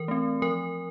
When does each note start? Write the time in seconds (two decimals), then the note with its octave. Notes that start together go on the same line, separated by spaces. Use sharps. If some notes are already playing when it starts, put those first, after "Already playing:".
Already playing: E3 A#4
0.08 A3 C4
0.42 F3 A#4